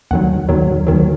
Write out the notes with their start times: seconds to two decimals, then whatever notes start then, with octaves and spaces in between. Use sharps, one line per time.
0.11 D#2 D#3 F#3 F#5
0.49 D#2 D#3 F#3
0.87 D#2 D#3 F#3